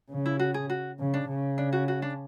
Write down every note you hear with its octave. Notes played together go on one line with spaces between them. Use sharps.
C#3
E4
F#4
G#4
F#4
C#3
D4
C#3
D4
F#4
F#4
D4